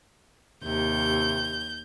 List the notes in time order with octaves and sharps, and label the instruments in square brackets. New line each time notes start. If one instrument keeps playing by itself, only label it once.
[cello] D#2 [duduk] C3 [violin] G6